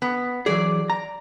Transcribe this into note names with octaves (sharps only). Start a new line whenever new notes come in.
B3
E3 F#3 G#4 D5
A#5